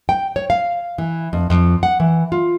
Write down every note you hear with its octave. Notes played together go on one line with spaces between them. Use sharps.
G5
C#5
F5
E3
F2
F2
F#5
E3
F4